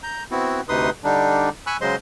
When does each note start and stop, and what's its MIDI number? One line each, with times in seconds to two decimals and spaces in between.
0.03 0.23 82
0.03 0.23 91
0.31 0.61 59
0.31 0.61 60
0.31 0.61 64
0.31 0.61 66
0.69 0.90 38
0.69 0.90 48
0.69 0.90 63
0.69 0.90 71
0.69 0.90 84
0.69 0.90 87
1.04 1.49 50
1.04 1.49 55
1.04 1.49 62
1.04 1.49 63
1.67 1.77 80
1.67 1.77 83
1.67 1.77 85
1.67 1.77 88
1.67 1.77 90
1.81 1.96 49
1.81 1.96 54
1.81 1.96 56
1.81 1.96 72
1.81 1.96 75
1.81 1.96 84